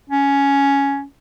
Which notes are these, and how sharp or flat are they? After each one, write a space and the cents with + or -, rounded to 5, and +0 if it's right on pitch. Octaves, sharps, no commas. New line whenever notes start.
C#4 +10